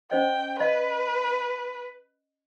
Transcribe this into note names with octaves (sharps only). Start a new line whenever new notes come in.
C#4 C5 D#5 G5
B4 D5 D#5 F5